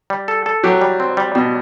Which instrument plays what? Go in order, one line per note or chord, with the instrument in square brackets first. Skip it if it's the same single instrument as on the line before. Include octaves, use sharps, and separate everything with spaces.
[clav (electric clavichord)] G3
A4
A4
[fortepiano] F#3 [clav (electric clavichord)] G4
[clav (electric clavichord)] G3
C4
G3
[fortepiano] B2 [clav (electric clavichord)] G3